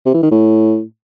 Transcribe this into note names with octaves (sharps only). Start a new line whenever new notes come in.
C3
E3
D#3
A2